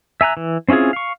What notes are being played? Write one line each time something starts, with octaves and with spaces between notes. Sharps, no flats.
E5 G#5 A#5 F#6
E3
C4 C#4 E4 F4 G#4
F5 C#6